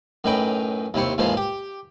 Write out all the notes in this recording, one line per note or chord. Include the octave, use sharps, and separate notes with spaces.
F#2 A2 D#4 B4 G5 A#5
D#2 C3 E4 C5 C#6
D#2 G#2 E3 F3 G#3 C5
G4